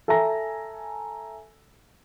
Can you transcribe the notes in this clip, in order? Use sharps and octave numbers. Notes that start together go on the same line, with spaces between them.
A4 E5 G#5 A#5 A#6